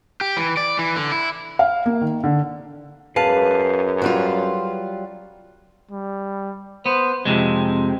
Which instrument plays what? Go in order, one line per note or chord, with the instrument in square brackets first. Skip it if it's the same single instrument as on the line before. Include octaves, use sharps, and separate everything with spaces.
[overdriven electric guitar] G4
E3
D5
E3
D3
E4
[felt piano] F5
A#3
D#3
D3
[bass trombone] F#2 [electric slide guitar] G#4 B4 F5 [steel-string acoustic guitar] A5
[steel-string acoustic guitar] F#3 G3 F4
[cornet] G3
[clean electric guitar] B3 [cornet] C5
[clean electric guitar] F2 C3 G#3 [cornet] C4